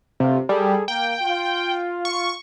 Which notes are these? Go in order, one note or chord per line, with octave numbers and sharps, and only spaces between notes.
G2 C3 A3 F4
G3 G#4 A4
A#3 G5
F4
C#6